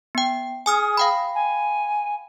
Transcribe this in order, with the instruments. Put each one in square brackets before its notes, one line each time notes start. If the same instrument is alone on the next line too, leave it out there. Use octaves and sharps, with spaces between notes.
[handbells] B3 G5
[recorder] G#4 [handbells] G#5 D#6 F6
[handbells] F5 G5 B5
[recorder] G#5